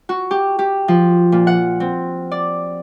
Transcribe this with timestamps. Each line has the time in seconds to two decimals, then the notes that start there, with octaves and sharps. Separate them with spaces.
0.09 F#4
0.31 G4
0.59 G4
0.88 F3
1.32 A#2
1.47 F#5
1.80 C4
2.31 D5